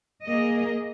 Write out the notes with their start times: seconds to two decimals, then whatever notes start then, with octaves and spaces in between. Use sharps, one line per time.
0.25 A#3 G#4 D#5